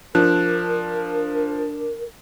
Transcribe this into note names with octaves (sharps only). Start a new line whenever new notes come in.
F3 D4 A#4 F#6